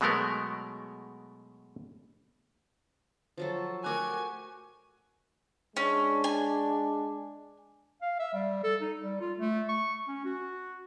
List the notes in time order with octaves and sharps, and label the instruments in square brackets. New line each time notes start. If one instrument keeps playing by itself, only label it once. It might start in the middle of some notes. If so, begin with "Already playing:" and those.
[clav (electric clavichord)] B2 F#3 G#3 A3 B3 A#4
[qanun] F3 F#3 A4
[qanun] A3 F#4 G4 [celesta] A#4 D6 F#6 [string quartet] G#5 G#6
[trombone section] G#3 D4 [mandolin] C#4
[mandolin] G#5
[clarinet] F5
E5
G3
A4
D#4
G3
F4
A3
C#6
C#4
F#4